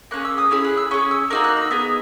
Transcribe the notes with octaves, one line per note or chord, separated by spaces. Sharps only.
A#3 C#4 G#4 F#6
E6
D#6
C#4 E4 G#4 E6
F#6
E6
C#4 G#4 C#6
E6
A#3 D#4 F#4 E6
F#6
E6
B3 D#4 G#4